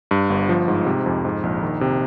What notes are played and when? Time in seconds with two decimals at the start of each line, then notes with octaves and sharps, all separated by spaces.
0.11 G2
0.30 G1
0.49 F3
0.68 G#2
0.87 C3
1.06 F2
1.25 G#2
1.43 A#1
1.62 D#3
1.81 C3